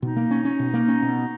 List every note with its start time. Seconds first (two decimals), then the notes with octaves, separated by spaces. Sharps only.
0.02 B2 D#4
0.16 A#3
0.31 C#4
0.45 C#4
0.60 B2
0.74 A#3
0.88 C#4
1.02 B2